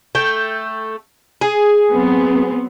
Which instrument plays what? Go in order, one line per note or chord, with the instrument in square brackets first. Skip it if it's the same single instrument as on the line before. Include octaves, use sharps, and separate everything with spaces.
[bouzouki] A3 G5
G#4
[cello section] F#3 B3 C4